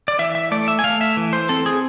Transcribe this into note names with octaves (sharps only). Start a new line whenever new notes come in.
D5
E3 E5
E5
A3 D5
E5
G#5
A3 F5
E5
E3
C5
C4 A4
G#4